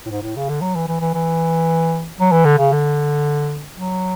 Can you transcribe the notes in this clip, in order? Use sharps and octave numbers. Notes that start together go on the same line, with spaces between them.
A2
G#2
A2
C#3
D3
F#3
E3
E3
E3
E3
F#3
E3
D3
C#3
D3
F#3